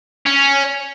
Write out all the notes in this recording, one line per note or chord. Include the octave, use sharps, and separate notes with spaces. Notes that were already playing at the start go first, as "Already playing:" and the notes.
C#4